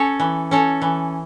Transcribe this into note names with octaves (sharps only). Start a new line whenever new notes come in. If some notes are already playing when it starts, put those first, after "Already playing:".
Already playing: C#4 A4 C#5
E3
C#4 A4 C#5
E3